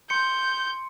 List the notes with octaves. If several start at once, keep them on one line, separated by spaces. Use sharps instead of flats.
C6 G6 C#7